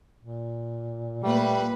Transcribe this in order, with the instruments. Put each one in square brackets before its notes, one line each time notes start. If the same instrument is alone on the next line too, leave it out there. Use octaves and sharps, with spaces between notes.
[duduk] A#2
[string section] A#2 B4 [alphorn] G3 [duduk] A3